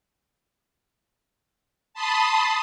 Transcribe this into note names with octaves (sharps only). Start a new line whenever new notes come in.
A5 B5 C6 D#6